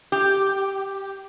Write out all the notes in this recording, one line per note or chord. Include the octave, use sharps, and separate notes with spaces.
G4